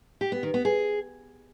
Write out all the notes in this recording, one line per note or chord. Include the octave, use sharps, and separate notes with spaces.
G4
B3
D#3
B3
G#4